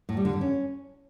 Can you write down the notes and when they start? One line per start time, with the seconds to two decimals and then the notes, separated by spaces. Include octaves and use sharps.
0.09 A2
0.17 G3
0.25 D3
0.33 G2
0.41 C#4